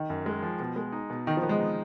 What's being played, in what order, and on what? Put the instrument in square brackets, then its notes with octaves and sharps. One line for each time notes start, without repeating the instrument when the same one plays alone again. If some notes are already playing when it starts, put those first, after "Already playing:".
Already playing: [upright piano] D#3
[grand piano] F#2
G#3
F3
B2
G#3
D#4
B2
[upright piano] D#3 [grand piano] D#4
[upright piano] F3
[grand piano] B3
[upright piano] G#3
[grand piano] D#4